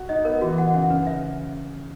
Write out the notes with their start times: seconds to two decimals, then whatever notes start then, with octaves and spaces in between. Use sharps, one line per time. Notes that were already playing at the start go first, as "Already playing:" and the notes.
Already playing: F#4
0.09 D#4 D#5
0.25 B3 A#4
0.41 E3 F#4
0.58 F#5
0.74 C#3 F#5
0.90 C#3 B4
1.07 E5